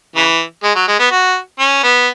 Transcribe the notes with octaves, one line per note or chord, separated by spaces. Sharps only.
C#3 E3
G#3
F#3
G#3
B3
F#4
C#4
B3